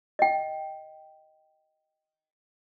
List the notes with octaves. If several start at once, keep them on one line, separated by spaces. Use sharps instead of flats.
D#5 G5